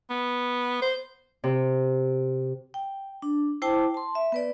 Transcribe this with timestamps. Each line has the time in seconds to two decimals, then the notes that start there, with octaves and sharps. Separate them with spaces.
0.10 B3
0.82 C5
1.44 C3
2.74 G5
3.22 D4
3.62 E4 C5 G5 A5 D6
3.94 A5 C6
4.15 E5
4.32 B3 B4 D5